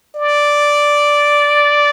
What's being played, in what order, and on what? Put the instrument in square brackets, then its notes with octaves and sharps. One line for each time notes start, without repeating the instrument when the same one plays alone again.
[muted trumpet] D5